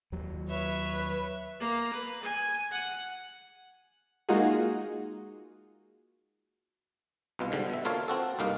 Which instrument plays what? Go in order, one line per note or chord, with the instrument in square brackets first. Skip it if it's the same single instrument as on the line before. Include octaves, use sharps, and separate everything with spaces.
[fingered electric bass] D#2 F#3
[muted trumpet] B4 [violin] C#5 E5
[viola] A#3
B4
G#5
F#5
[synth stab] G#3 A#3 D#4 F4 F#4 G#4
[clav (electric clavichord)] C2 B2 F4
G#2 D3 G3
B2 E5
A#3 F4 A4 C#5 F5
C4 F#4 A4
C2 G2 A#3 D#4 F5